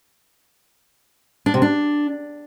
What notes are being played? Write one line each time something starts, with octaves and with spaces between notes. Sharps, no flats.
D4
C3
D4